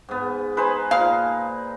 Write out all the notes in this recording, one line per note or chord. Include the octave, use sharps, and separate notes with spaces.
G#2 B3
D#4 G#4 B4 C5 G#5
A#2 F3 D#4 F5